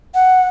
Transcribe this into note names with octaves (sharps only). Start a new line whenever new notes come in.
F#5